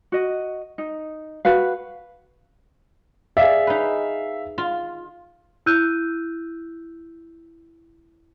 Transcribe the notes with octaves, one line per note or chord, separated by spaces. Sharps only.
F#4 D#5
D#4
F#4 B4 F5
G#4 D5 E5 F5
D#4 B4
F4
E4 E6 F#6 G6 D#7